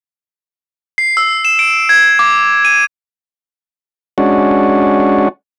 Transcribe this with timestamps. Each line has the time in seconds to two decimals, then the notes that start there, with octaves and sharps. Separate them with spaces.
0.98 C7
1.17 E6
1.45 E7
1.59 D7
1.89 G#6
2.19 D6
2.65 D#7
4.18 G#3 C#4 D4 F#4